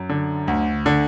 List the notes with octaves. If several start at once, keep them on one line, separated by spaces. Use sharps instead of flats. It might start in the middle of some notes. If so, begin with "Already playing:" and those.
Already playing: F#2
D3
D2
D3